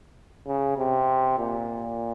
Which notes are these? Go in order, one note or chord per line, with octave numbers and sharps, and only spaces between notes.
C#3
C3
A#2